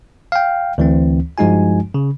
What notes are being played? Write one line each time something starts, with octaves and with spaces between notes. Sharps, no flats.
F5 G5
D2 E3 C4
G2 F3 G#3 D#4 F#4 G#5
C#3